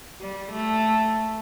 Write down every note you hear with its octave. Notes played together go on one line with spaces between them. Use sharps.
G3
A3